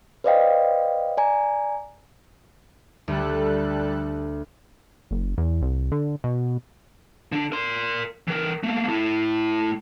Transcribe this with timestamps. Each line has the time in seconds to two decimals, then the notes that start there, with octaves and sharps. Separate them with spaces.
0.24 B4 C5 D5 D#5 F5 G5
1.17 D5 G#5 A#5
3.08 D2 G3 A4 F#6
5.11 F#1
5.38 E2
5.62 C2
5.92 D3
6.24 B2
7.32 D3 D4
7.52 A#4 C6
8.28 E3 A#4
8.63 A3 A#3
8.89 A3 E4